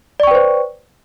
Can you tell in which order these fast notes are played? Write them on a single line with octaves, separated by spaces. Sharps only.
D5 C#6 G5 B4 C5